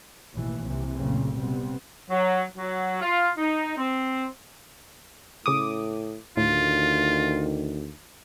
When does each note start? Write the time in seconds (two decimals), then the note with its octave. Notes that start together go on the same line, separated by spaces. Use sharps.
0.32 A1 D#2 B2 E3
0.62 C2 C3 E3
0.94 F#1 A#2 C#3 A3 A#3 C4
1.35 C3 G3 B3 C4
2.11 F#3
2.57 F#3
3.02 F4
3.38 D#4
3.77 C4
5.46 A2 C#3 D6 D#6
6.37 D2 A2 D#3 F4